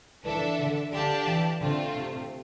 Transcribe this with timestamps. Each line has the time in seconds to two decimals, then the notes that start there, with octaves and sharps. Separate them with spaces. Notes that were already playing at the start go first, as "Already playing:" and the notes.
0.24 E3 D4 A4 E5
0.58 D3
0.92 D3 D4 G4 D5 F5 A5
1.26 E3
1.61 D3 A3 C4 F4
1.95 C3